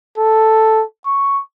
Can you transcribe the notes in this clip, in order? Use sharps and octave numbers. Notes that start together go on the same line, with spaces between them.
A4
C#6